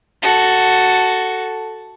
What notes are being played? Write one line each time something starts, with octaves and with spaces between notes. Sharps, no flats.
F#4 A4